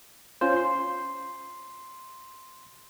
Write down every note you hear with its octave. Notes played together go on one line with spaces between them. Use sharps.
C#4 F4 C5
C6